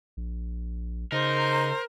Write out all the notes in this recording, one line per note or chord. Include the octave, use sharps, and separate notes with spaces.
A#1
C#3 D#4 A#4 C5